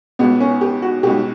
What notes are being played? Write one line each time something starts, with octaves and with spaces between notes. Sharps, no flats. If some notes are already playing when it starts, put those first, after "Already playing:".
C#2 B2 B3
C#4
G4
F#4
C#2 B2 G4